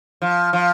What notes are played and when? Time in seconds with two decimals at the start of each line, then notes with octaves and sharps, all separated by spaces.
0.22 F3
0.53 F3